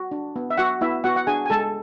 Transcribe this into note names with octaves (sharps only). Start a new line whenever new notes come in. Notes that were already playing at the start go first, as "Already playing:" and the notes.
Already playing: F#4
D4
B3
E5
F#4 F#5
B3 E4 E5
B3 F#4 F#5
F#5
D4 G#4 G#5
G#5
G#3 A4 A5